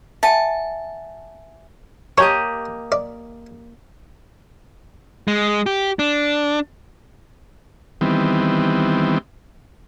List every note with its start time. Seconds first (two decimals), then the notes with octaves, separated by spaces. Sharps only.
0.23 E5 F#5 G#5 A5
2.18 A#3 G4 C#5 D#5 A5 C#6
2.92 D5
5.28 G#3
5.66 G4
5.99 D4
8.01 D#3 E3 G3 B3 C4